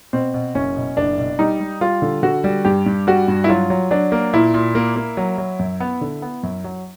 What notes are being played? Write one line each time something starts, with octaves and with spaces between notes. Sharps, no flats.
B2 C4
B2
F#1 C#4
B2
F#1 D4
B2
G3 D#4
G3
G3 F4
D3
D3 F#4
G3
G2 G4
G2
G3 F#4
G2
E4
F#3 F4
F#3
F#3 D4
A#3
A#2 E4
A#2
A#3
A#3
F#3
F#3
F#2
B3
D3
B3
F#2
F#3